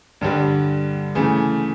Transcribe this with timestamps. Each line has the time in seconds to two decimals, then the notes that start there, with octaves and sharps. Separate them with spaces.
0.21 G2 D3 G3 D4
1.15 C#3 E3 A3